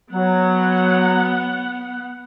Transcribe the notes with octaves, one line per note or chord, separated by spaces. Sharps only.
F#3 B3 F#5